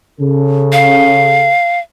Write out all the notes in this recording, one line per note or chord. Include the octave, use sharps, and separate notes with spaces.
C#3 A4
F5